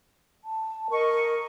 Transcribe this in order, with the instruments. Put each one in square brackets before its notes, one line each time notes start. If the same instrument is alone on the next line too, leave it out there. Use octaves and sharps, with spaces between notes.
[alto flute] A5
[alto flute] A#4 [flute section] D#5 C#6